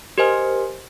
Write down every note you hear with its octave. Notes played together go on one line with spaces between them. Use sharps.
G4 A#4 C5 D#5 G#5 F6